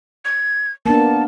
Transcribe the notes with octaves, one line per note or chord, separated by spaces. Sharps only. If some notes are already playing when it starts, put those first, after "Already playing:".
G#6
A#3 B3 D4 A5